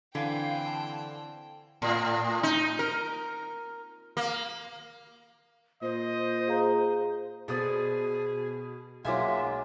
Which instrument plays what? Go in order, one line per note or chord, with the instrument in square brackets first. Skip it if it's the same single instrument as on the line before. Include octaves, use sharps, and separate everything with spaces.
[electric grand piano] D3 [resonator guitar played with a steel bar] E3 [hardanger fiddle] C4 G5 [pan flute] F5
[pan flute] A5
[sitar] A2
D#4
A#4
A#3
[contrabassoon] A#2 [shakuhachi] C5 [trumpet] D#5
[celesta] G#4 F5 A#5
[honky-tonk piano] B2 D#6 [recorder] G#4 [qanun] A4 C5 D5
[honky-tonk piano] B1 D6 [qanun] F#3 A#3 G#5 [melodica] G#3 F4 [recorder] E5